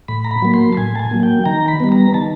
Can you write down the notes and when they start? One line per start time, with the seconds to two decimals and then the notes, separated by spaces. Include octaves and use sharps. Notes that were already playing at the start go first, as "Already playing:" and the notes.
0.08 A2 B5
0.24 A#5
0.31 B5
0.42 F#3 A#3
0.54 C6
0.73 A5
0.77 A2 G#5
0.95 A5
0.99 G#5
1.11 F#3 A#3
1.23 G5
1.45 D#3 A#5
1.68 B5
1.80 G3 B3
1.92 A#5
2.14 D#3 A5